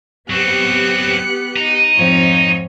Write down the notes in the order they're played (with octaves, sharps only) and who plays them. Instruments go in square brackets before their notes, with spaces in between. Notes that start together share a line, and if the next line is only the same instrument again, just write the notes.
[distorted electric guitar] F#3 C4 [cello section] B3 G4 [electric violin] F#6 C#7
[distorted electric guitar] D#5 A#5
[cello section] F2 G#2 F3 [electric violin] C4 C#5